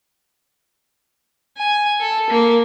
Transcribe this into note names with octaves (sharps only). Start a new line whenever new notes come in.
G#5
A4
A#3